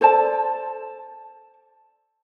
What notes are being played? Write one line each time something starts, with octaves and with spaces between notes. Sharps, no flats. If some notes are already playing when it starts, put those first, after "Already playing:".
A4 C5 D5 A5